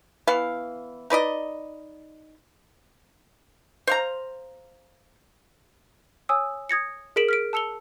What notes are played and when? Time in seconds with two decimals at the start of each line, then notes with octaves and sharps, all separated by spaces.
0.27 E3 B3 F5
1.10 D#4 B4 D5 D#5
3.87 C5 F5 A#5
6.29 C#5 G#5 D#6 E6
6.69 D#6 G#6 A#6 C#7
7.16 G#4 A#4 B6 D7 E7 F#7
7.29 F6 B6 D7
7.53 A5 E6 C#7 F7 G7